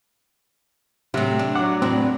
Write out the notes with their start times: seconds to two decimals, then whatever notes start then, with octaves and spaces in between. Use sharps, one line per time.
1.14 A2 C3 F#3
1.39 D4
1.55 F#3 F#5 D6
1.82 E2 A2 C4 D4